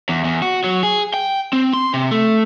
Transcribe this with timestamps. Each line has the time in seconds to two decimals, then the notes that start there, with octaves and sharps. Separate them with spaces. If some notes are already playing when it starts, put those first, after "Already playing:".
0.09 E2
0.24 E2
0.42 F#4
0.64 F#3
0.83 G#4
1.14 G5
1.53 C4
1.73 C6
1.94 C3
2.11 A3